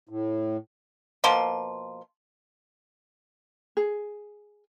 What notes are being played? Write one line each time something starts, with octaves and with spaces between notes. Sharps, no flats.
A2
B2 F3 A#3 C6
G#4